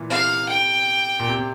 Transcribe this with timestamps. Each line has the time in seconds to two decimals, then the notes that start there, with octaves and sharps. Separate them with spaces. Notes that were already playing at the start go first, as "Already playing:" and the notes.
Already playing: A#2 E3
0.10 C3 F5
0.49 G5
1.20 A#2
1.27 C3
1.39 C3